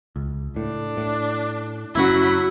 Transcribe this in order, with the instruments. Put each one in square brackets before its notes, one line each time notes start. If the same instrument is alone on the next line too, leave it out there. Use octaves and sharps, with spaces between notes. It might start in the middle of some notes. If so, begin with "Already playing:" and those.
[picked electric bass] C#2
[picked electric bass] A2 [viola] D4
[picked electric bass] A2
[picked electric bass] F#1 C4 C#4 [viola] F#3 B5 [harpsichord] E4 F#4